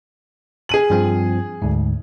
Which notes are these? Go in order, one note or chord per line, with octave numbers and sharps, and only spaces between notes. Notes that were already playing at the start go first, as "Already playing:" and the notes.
G#4 D#7 F#7
G2 F3 C4
D2 G#2